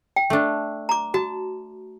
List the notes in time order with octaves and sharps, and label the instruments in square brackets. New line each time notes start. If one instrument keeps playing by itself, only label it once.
[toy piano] G5
[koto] A3 D4
[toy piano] A#5 D6
[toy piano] F#4 [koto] A5